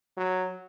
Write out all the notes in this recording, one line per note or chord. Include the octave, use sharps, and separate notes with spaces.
F#3